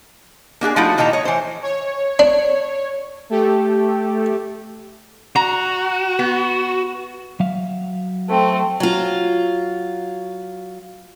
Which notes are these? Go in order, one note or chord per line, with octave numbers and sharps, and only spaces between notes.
A#3 D4 G4 G#4
F3 A3 D#4 E4 F#4
A#2 D#3 D#5 G5 A5 A#5
C#5 D#5
E3 C5
C#5
D4
A3 G4 A4
F#4 A#5
B3
F#3 E5 F5
A3 C4
F#3 F4